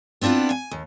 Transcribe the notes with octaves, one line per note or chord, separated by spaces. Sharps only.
B3 C4 D4 E4 F4
G#5
D#2